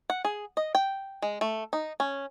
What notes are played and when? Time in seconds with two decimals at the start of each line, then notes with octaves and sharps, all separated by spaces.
0.10 F#5
0.25 G#4
0.57 D#5
0.75 G5
1.22 G#3
1.41 A3
1.73 D#4
2.00 C#4